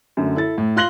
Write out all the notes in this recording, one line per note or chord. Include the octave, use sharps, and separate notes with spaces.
F#2 D3 A3
E4 A4 A6
A2
F4 C6 F#6 A#6 F#7 G7